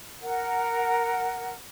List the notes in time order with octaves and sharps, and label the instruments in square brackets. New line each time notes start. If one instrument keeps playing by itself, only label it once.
[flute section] A#4 F#5